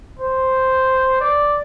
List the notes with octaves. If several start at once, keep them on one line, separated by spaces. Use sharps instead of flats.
C5
D5